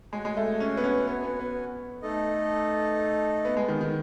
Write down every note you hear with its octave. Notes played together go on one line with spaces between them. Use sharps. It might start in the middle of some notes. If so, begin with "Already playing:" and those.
G#3 F#4 C#5 G#5
G#3
A3
C#4
B3
C#4
B3
B3
B3
A3 D#4 A4 D#5
B3
G#3
D#3
D#3